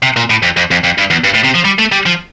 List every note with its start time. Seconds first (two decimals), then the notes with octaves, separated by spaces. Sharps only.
0.03 C3
0.16 A#2
0.30 A2
0.43 F2
0.57 F2
0.71 F2
0.84 F2
0.98 G2
1.10 E2
1.24 G2
1.35 A2
1.44 C3
1.55 F3
1.65 G3
1.79 A3
1.92 G3
2.06 F3